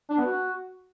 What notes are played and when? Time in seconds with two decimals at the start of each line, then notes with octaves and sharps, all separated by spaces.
0.10 D4
0.18 B3
0.26 F#4